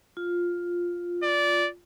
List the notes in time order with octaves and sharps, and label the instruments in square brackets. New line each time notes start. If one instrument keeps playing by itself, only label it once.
[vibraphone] F4
[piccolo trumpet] D5